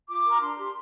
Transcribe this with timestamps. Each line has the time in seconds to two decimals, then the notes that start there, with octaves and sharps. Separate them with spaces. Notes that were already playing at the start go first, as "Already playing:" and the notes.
0.09 F4 D6
0.25 A#4 A#5
0.41 D4 C6
0.58 G4